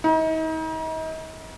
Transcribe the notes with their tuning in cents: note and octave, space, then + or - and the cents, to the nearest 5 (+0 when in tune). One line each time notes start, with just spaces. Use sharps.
D#4 +40